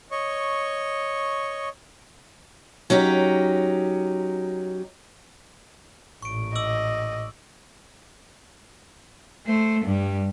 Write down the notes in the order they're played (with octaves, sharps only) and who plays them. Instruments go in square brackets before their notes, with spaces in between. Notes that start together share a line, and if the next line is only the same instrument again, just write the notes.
[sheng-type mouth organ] C#5 D#5 C#6
[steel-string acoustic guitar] F#3 C#4 D#4 G4
[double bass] A1 A#2 [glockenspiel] C#6 D7
[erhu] D#5 [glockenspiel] D6 E6 F#7
[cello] A3 C5
G2 G3